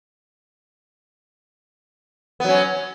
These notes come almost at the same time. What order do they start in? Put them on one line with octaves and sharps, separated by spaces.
B3 F#3 C#4